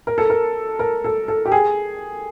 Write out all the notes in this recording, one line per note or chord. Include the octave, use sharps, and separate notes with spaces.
A#4
A4
A#4
A#4
A4
A4
G4
G#4